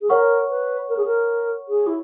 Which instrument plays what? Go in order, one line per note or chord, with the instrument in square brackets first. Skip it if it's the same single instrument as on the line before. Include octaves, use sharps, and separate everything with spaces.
[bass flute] G#4
[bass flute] A#4 [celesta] C#5 F#5 C#6
[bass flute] B4
A#4
G#4
A#4
G#4
E4